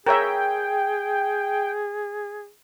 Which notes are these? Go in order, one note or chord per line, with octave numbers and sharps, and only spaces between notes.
G#4 A#4 C#5 E5 G5